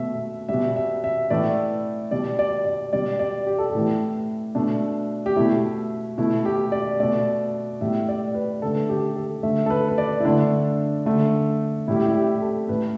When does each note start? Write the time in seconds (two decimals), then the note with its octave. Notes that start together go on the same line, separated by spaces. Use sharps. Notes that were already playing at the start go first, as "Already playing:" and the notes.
Already playing: B2 A3 E5
0.49 G3 E5
0.54 B2
0.76 E5
1.04 E5
1.30 A2 E3 A3 D5
2.11 B2 G3 D5
2.39 D5
2.65 D5
2.93 B2 G3 D5
3.19 D5
3.47 G4
3.58 A4
3.70 G4
3.75 A2 E3 A3
4.55 B2 A3 D4
5.26 G4
5.36 B2 A3 E4
6.18 B2 A3 E4
6.45 G4
6.72 D5
7.00 B2 A3 D5
7.81 A2 G3 E5
8.09 D5
8.35 B4
8.62 D3 A3 A4
8.89 G4
9.16 A4
9.43 D3 A3 E5
9.66 A4
9.70 B4
9.88 B4
9.98 D5
10.20 E4
10.25 D3 A3 D4
11.06 D3 A3
11.88 A2 G3 E4
11.96 G4
12.05 E4
12.15 G4
12.41 A4
12.69 A2 A3 B4